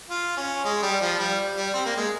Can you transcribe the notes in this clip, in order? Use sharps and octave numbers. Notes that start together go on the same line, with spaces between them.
F4
C#4
G#3
G3
F3
G3
G3
C4
A#3
G#3